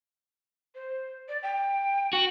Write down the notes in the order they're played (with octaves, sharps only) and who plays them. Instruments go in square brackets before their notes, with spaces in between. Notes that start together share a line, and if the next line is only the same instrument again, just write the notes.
[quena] C5
D5
G5
[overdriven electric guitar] F#4